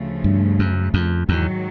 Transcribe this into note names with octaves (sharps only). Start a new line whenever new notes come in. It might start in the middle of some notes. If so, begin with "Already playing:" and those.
Already playing: D2 C#3 F3 A3
G2
F#2
F2
E2 G#2 D#3 F#3